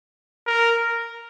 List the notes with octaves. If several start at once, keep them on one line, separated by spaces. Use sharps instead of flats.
A#4